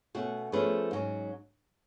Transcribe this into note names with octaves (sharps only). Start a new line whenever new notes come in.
B2 A3 C#4 F#4
F3 A3 C#4 G#4 B4
G#2 F#3 C#4